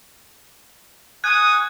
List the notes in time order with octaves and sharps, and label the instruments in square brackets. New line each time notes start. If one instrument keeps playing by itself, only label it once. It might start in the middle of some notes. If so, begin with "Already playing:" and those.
[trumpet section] F#4 G#5 D#6 [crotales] F#6 G#6